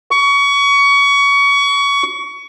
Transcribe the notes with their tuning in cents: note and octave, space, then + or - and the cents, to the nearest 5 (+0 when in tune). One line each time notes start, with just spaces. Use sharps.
C#6 +25